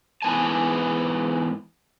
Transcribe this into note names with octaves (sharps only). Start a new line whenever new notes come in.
G#2 E3 B3 G#5 A5